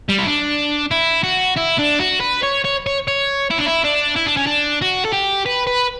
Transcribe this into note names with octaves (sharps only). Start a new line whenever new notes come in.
G3
E4
D4
E4
F#4
E4
D4
F#4
B4
C#5
C#5
C#5
C#5
E4
D4
E4
D4
E4
D4
C#4
D4
F#4
A4
G4
B4
B4